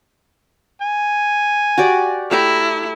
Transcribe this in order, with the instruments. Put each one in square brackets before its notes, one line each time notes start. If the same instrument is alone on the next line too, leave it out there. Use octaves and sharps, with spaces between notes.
[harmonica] G#5
[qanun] F#4 G4 D5
[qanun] A3 G4 A#5 [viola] E4